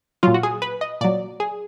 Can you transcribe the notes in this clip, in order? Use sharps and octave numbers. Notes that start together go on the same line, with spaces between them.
A#2 F#3 F4
F#4
G#4
B4
D#5
A#2 F#3 D5
G#4